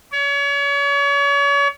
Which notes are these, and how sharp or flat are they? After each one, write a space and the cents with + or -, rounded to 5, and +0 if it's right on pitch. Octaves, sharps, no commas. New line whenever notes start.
C#5 +35